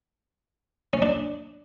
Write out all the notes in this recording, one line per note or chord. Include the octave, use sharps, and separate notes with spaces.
C#4
D4